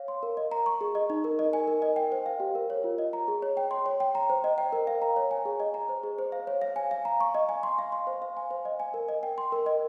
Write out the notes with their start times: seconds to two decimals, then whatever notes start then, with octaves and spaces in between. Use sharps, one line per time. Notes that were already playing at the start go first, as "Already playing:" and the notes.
Already playing: C#5 F5
0.08 C6
0.23 A#4
0.37 D#5
0.51 A#5
0.66 C#6
0.81 G#4
0.95 D#5
1.10 D#4
1.24 A#4
1.39 D#5
1.53 G#5
1.68 A#4
1.82 D#5
1.96 G5
2.12 C5
2.26 F5
2.40 G4
2.55 A#4
2.70 C#5
2.84 F4
2.98 D#5
3.13 A#5
3.28 G#4
3.42 C#5
3.57 G5
3.71 C6
3.86 C#5
4.00 G5
4.15 A#5
4.30 C5
4.44 D#5
4.58 G5
4.73 A#4
4.87 F5
5.02 A#5
5.16 C#5
5.31 G#5
5.45 G#4
5.60 D#5
5.74 A#5
5.89 C5
6.03 G#4
6.18 C5
6.32 F5
6.47 C#5
6.62 F5
6.76 G#5
6.91 F5
7.05 A#5
7.21 C#6
7.35 D#5
7.49 G#5
7.63 C6
7.79 F5
7.92 C6
8.07 C5
8.22 F5
8.37 G#5
8.51 C5
8.65 D#5
8.80 G#5
8.94 A#4
9.09 D#5
9.23 G5
9.38 C6
9.52 A#4
9.66 D#5